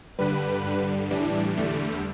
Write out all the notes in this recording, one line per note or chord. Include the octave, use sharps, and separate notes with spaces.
G2 D3 G3 B4
G2 D3 G3
A2 E3 G3 D4
E2 D3 G3 A3